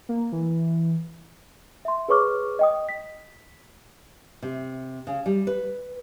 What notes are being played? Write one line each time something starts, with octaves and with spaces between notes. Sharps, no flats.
A#3
E3
E5 C6
G#4 B4 C#5 C#6 D6 F6
D#5 G5 D#6
B6
C3
C#3
G3
B4